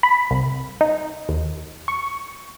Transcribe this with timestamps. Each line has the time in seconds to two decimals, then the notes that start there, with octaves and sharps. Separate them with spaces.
0.03 B5
0.31 C2
0.81 D#4
1.29 D#2
1.88 C#6